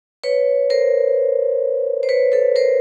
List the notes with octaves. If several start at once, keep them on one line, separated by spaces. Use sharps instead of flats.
B4 C#5
A#4 C5
C5
B4 C#5
A4 B4
A#4 C5